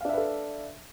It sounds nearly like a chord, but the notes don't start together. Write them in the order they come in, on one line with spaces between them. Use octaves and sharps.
F5 D4 E5 B4 A4